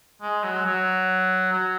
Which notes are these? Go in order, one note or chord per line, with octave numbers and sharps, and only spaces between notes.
G#3
F#3
F#3
F#3